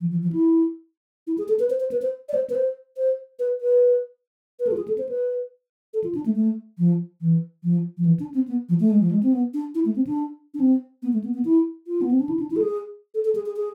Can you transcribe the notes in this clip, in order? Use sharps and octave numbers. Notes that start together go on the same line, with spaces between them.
F3
F3
F3
E4
E4
G#4
A4
B4
C5
C5
B4
C5
D5
C5
B4
C5
C5
B4
B4
B4
A4
F4
G#4
A4
C5
B4
A4
F4
D4
A3
A3
F3
E3
F3
F3
E3
D4
C4
B3
F3
A3
G#3
F3
G#3
C4
B3
D4
E4
A3
C4
D4
D4
C4
B3
A3
B3
B3
E4
F4
B3
C4
D4
E4
D4
E4
A4
G#4
A4
A4
G#4
G#4
G#4